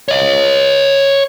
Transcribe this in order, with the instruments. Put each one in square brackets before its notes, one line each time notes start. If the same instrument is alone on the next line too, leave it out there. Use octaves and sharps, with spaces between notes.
[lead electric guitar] C#5 D#5